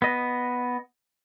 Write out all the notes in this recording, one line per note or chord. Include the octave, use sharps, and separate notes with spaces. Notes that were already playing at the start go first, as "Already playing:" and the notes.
B3 D#5